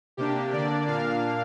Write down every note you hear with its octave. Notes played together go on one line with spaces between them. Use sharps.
C3 A#3 D4 G4
D3 A#3 D4 D5
A#2 A#3 D4 F5